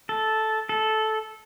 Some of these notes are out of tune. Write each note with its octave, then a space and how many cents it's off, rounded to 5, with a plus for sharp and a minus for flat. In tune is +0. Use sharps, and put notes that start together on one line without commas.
A4 -10
A4 -10